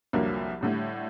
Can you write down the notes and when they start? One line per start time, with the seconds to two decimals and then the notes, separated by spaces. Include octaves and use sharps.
0.13 C2 F2 D3 F#3 A#3
0.61 A2 D3 G3